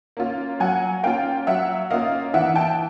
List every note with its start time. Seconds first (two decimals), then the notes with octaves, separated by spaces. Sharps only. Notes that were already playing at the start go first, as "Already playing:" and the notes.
0.17 A#3 C#4 F4
0.60 F#3 F#5 G#5
1.03 A#3 C#4 F4 F5 G5
1.47 F#3 E5 F#5
1.90 A#3 C#4 F4 D#5 F5
2.34 E3 E5 F#5
2.55 G5 A5